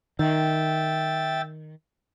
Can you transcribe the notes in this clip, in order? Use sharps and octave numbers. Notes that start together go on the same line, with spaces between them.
D#3 E5 G5 A6